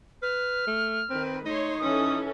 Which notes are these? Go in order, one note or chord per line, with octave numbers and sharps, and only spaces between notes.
B4 F6
A3
D#3 C4 B4
A3 D#4 C#5 C6
E3 C#4 A4 D#6